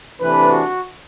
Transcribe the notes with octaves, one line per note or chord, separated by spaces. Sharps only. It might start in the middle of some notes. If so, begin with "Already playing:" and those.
C3 E3 A3 D4 B4
F#4